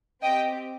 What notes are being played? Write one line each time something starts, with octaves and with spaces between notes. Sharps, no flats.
C4 G4 D#5 G5